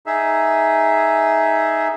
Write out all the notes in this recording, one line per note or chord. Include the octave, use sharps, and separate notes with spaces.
D#4 G#4 E5